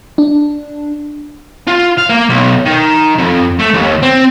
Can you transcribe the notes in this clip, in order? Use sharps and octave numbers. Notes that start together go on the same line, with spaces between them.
D4
F4
F5
A#3
B1
D#3
F2
A3
D#2
C4